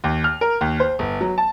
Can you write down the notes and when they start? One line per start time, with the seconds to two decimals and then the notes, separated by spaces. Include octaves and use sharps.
0.04 D#2
0.24 F6
0.41 A#4
0.61 D#2
0.80 C5
0.99 G1
1.21 F#3
1.38 A5